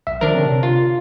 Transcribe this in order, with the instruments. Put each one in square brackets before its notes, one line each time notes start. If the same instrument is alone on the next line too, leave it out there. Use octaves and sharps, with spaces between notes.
[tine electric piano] B1 E5
[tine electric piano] D#3 F3 C5 [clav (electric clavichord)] D4 A#4
[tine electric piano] D3 C4 C#5
C3
[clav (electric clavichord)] F4